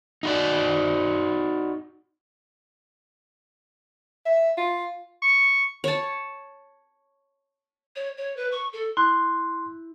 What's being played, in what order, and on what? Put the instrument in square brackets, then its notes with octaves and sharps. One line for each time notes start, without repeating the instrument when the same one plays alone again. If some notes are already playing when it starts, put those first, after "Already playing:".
[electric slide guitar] D#4 F#4 D5
[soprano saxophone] E5
F4
C#6
[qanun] C#5 A5
[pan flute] C#5
C#5
B4
C#6
A4
[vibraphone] E4 [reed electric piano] C6 F#6